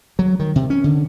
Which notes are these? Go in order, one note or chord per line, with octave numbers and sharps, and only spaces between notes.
F#3
D#3
C3
C#4
D3